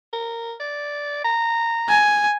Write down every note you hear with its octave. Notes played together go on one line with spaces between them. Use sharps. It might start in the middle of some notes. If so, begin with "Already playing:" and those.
A#4
D5
A#5
G#5